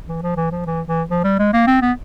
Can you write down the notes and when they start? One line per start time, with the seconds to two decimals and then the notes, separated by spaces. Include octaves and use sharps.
0.08 E3
0.23 F3
0.37 E3
0.51 F3
0.66 E3
0.87 E3
1.10 F3
1.24 G3
1.39 G#3
1.53 A#3
1.67 C4
1.82 B3